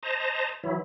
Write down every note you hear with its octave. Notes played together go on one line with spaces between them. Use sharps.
C5 D#5 A5 A#5
E3 F#3 E4